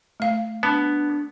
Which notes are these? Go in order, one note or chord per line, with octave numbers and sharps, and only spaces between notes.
A3 F5
B3 D4 A5